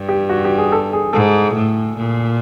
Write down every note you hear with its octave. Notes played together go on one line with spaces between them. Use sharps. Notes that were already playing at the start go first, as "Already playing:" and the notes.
Already playing: G2
G4
F#4
G4
G#4
A4
G#4
G#2 A4
A2
A#2